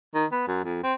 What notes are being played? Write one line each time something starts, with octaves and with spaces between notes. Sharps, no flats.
D#3
B3
F#2
F2
C4